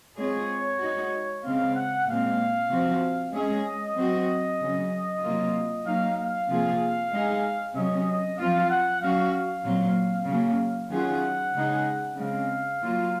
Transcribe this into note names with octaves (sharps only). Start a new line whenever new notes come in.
G#3 C4 F4 G#4 C#5
G#3 D#4 F#4
C#3 G#3 C4 F5
F#5
A#2 G#3 C4 F5
C3 F3 C4 F#4
G#3 C#4 G#4 D#5
F#3 C4 F#4
C#3 F#3 C#4
C3 F#3 A#3 F4
F#3 A#3 D#4 F5
F5
C3 F3 A#3 F4 G#4
G#3 D#4 G#4
C3 F#3 C#4 D#5
F3 C4 F4 F5
F#5
F#3 C#4 F#4 F5
F5
A#2 F#3 C4
C#3 F#3 A#3
D#3 F#3 C#4 F4 G#4 F#5
C#3 G#3 D#4 G#4
C#3 G#3 C4 F5
F#3 A#3 F4